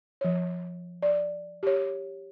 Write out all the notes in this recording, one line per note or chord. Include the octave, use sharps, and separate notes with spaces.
F3 C#5
D5
G4 C#5